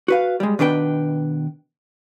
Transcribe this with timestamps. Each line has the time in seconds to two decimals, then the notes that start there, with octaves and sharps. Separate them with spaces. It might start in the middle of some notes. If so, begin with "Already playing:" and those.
0.08 F#4 B4 F5
0.40 G3 G#3
0.59 B2 D#3 D4 B4 G5